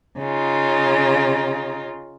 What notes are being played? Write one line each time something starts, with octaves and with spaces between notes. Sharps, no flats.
C#3 D#4 F4